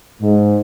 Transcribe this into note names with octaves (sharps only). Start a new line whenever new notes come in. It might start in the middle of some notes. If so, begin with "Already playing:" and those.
G#2